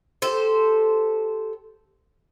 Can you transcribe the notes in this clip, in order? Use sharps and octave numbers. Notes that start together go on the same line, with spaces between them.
G4 A4 C5